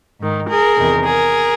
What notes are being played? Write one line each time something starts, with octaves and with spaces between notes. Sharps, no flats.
G#2 D#3
G#4 A#4
E2 C3 D#3
G#4 A#4